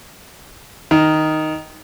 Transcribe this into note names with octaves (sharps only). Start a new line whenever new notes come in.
D#3